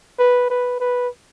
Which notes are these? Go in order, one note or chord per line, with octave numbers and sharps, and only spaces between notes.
B4
B4
B4